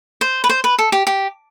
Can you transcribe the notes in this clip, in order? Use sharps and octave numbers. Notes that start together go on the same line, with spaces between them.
C5
B4
C5
B4
A4
G4
G4